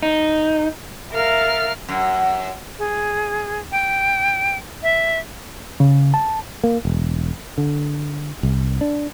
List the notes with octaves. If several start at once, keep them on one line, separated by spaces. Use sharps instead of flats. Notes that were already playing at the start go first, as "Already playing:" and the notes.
D#4
A#4 E5 F5 F6 A6
F#2
G#4
G5
E5
C#3
A5
A#3
E1
D3
C2
D4